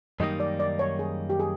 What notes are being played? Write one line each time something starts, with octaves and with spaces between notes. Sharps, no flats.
F#2 D#3 G3 A#3 D#4 D#5
D5
D5
C#5
G#4
G4
G#4